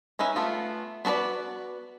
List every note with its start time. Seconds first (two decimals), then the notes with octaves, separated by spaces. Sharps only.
0.19 C#4 D#4 B4 E5 G#5
0.36 A3 B3 F4
1.05 B3 F#4 A4 B4 D5